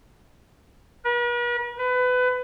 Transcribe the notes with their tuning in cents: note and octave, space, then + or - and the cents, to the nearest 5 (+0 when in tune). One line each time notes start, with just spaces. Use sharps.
B4 -45
B4 +25